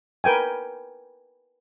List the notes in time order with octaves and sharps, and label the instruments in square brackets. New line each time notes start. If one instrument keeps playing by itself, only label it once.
[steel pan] A#4 B4 G5 G#5